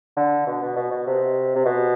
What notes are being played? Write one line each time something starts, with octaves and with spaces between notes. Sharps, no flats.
D3
B2
B2
B2
B2
C3
C3
B2